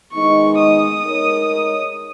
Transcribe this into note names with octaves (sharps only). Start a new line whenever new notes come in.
D#3 G#3 B3 D#4 C#6
D#6
G#3 D#4 A#4 C#5